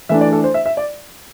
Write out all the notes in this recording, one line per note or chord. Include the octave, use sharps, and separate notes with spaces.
E3 A3 D4 E5
D5
A4
C5
E5
E5
D5